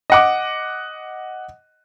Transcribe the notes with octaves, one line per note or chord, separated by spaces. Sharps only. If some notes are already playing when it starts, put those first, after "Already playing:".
D#5 F#5 D6